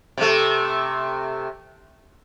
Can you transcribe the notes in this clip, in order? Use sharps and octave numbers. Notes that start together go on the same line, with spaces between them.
C3 A3